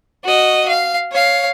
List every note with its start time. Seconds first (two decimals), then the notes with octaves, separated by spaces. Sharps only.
0.24 F#4 D#5
0.68 F5
1.12 C#5 F5